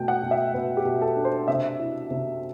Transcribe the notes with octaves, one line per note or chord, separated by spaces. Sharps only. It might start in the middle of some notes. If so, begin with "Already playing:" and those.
Already playing: B2 A3 G5
F#5
B2
E5
B2 B4
G4
B2
A4
D4
C5
C3 E5
E4
C3